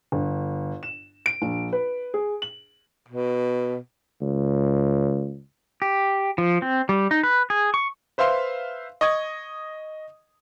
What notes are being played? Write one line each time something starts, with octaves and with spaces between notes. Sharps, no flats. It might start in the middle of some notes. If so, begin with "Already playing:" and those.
G1
E7
D7
A#1
B4
G#4
F#7
B2
C#2
G4
F3
C4
G3
D#4
B4
G#4
C#6
B4 C5 E5 F5 C6
D#5 C#6 D#6 G#6